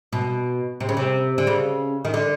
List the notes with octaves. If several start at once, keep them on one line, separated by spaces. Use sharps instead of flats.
B2
C3
C#3
C3
D3
C#3
D#3
D3